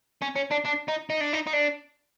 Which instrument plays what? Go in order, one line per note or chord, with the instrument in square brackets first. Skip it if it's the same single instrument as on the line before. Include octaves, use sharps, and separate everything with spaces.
[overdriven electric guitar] C#4
C#4
D4
D4
D#4
D#4
D4
D#4
D#4
D4